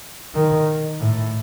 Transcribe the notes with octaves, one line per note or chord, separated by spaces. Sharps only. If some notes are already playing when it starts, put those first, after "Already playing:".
D#3
A2